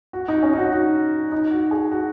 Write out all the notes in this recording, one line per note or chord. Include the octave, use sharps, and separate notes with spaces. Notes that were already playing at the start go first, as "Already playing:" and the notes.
F#4
D#4
C#4
D#4
F#4
F#4
D#4
F#4
G#4
F#4